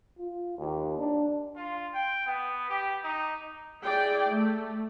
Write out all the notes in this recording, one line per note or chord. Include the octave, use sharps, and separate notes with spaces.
F4
D#2
D4
F4
G5
B3
G4
D#4
E4 G#4 D5 G5
A3